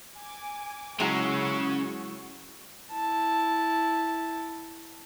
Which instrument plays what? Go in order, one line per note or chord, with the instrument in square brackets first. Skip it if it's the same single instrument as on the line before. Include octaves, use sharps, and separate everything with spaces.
[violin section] G#5 D6
[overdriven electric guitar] C#3 C#4 [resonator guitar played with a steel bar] F#3 G#3 E4 [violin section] F#4 C#6
[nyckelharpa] E4 A5